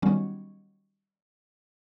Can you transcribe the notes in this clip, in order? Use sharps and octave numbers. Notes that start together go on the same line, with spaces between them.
D#3 F#3 G3 B3 C#4